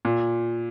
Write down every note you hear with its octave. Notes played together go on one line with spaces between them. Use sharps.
A#2